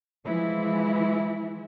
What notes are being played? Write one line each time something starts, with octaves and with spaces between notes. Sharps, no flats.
E3 F3 G#3 E4